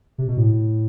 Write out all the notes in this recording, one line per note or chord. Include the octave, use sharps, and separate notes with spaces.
C3
B2
A2